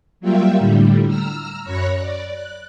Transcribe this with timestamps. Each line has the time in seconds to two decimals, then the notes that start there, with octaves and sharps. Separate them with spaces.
0.20 F#3 G3 A#3 F4 E5 G5
0.56 A2 D3 G3
1.06 A#5 E6 F6
1.63 F#2 C#5 B5 C#6 F#6 A#6
1.98 D5
2.32 F#6